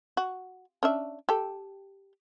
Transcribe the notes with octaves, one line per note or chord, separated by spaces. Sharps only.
F#4
C#4 D4 E5
G4 A4